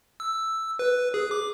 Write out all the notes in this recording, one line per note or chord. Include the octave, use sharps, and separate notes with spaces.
E6
B4
G#4
D6